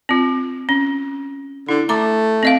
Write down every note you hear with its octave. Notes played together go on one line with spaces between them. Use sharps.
C4 F4
C#4
D3 E4
A3 A#5 D6
C4 D#5 F5